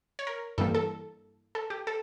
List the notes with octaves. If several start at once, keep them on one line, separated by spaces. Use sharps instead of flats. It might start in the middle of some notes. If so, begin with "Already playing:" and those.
C#5
A#4
G2 E3 G3 A#3 A4
A4
A4
G4
A4